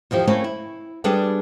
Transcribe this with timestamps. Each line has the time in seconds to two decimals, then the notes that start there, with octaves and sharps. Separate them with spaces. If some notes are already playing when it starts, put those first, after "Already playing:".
0.11 E2 D#3 F3 G4
0.27 A3 A#3 C4 C#4 E4 A4
0.44 E4
1.04 G3 B3 D4 G#4 A4 D5